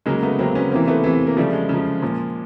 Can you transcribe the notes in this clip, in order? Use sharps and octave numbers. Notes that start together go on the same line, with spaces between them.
C#3 F#3 G#3 A#3
A3 B3
C#3 F#3 A#3 C4
B3 C#4
C3 E3 A#3 C4
A3 B3
C3 E3
A#3
C#3 F3 G3 A3
G#3
C#3 F3
A#2 F3